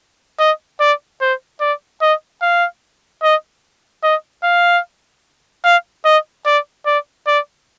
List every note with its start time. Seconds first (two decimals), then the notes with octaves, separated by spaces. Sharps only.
0.39 D#5
0.80 D5
1.21 C5
1.61 D5
2.01 D#5
2.42 F5
3.23 D#5
4.03 D#5
4.44 F5
5.65 F5
6.05 D#5
6.46 D5
6.86 D5
7.27 D5